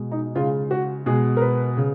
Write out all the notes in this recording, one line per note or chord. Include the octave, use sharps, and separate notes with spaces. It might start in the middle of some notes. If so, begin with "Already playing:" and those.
Already playing: B2 G#3
D#4
C#3 G#3 F4
F#4
B2 G#3 G#4
A#4
B4
C#3